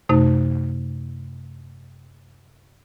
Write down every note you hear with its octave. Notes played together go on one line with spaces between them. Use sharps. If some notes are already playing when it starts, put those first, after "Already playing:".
F#2 C3 A3 D#4